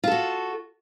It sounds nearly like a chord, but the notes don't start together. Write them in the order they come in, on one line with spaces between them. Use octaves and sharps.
F4 A4 F#4